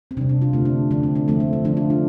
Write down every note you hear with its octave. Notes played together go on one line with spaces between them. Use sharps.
C4
C3 G3 D4
D4
F4
D3 A3 C4
D4
D3 F3 A3 D4
C4
D4
D3 F3 A3 C4
C4
C4
D3 F3 A3 D4
F4
D4